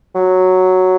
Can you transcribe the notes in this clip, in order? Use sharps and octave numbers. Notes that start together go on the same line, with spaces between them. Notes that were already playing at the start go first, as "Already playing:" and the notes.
F#3